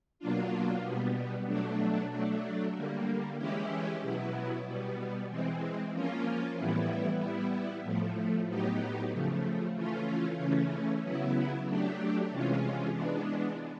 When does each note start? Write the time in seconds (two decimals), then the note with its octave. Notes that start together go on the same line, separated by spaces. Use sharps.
0.19 B2 F#3 A#3 D4 F4
0.83 B2 G3 B3
1.46 B2 F#3 A3 D4
2.10 F#3 A3 D4
2.74 D3 G3 A#3
3.37 E3 G#3 C#4 E4 G4
4.02 B2 F#3 B3 E4
4.65 B2 G3 B3
5.29 E3 G#3 C4
5.92 F3 A#3 C#4 F4
6.56 A2 E3 G3 B3 E4
7.19 G3 B3 E4
7.84 A2 F3 A3
8.47 A2 F#3 B3 D#4 G4
9.11 C#3 F3 A3
9.74 E3 A3 C#4 F4
10.38 C#3 E3 A3 C#4
11.02 C#3 F#3 B3 E4
11.65 F#3 A3 D4 G4
12.29 C3 E3 G#3 C#4 F4
12.93 E3 G#3 B3 D4